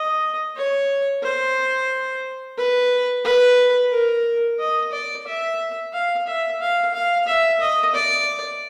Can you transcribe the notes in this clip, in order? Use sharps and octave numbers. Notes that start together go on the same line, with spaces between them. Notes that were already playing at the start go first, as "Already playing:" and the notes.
Already playing: D#5
C#5
C5
B4
B4
A#4
D#5
D5
E5
F5
E5
F5
F5
E5
D#5
D5